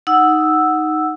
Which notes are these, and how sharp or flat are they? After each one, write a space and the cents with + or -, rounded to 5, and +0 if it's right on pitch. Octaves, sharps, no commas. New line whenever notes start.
D#4 +0 F#5 +0 E6 +0